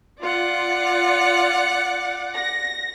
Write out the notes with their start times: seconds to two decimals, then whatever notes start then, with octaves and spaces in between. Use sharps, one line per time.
0.21 F4 D5 F#5
2.35 A#6